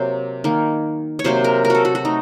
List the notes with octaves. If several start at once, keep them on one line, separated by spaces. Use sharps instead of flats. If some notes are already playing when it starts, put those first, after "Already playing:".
Already playing: C3 F#3 A#3 C5
D#3 A#3
C#5
C3 F#3 A#3 C5
A#4
A#4
F#4 A4
F#4
F#4
A3 D#4